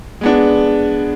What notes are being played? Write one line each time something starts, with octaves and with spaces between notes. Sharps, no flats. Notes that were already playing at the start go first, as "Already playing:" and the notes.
G#3 B3 D4